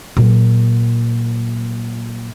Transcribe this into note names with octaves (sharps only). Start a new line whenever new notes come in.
A#2 F#3